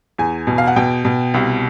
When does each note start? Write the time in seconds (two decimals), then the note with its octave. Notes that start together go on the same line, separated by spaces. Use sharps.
0.19 E2 G#5
0.47 B2
0.58 F5
0.68 F#5
0.76 B2 G5
1.05 B2
1.34 C2